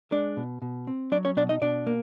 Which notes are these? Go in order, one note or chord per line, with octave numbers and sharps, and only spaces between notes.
G#3 D4 D5
B2
B2
C4
F#3 D4 D5
C#4 C#5
B2 D4 D5
D#4 D#5
B2 D4 D5
A#3